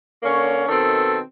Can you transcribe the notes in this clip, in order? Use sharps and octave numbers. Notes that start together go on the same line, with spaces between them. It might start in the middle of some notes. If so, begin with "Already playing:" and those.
D3 A#3 C#4 C#5
B2 D#3 C4 A4